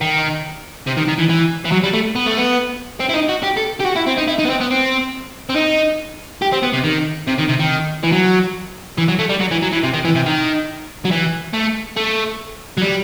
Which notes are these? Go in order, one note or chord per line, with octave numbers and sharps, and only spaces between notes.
D#3
C3
D#3
D#3
E3
E3
E3
F#3
G3
A3
B3
A3
B3
C4
E4
D#4
F#4
G4
A4
G4
F#4
E4
C4
D#4
E4
D#4
B3
C4
B3
C4
C4
D#4
G4
C4
B3
C3
D#3
C3
D#3
C3
D#3
E3
F#3
E3
F#3
A3
G3
F#3
E3
F#3
E3
C3
D#3
E3
C3
D#3
F#3
E3
A3
A3
F#3
G3